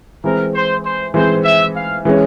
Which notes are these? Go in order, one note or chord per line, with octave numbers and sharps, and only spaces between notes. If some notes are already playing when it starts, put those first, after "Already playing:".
E3 G#3 C4 A#4
C5
C5
E3 G#3 C4 C5
E5
F5
E3 G#3 C#4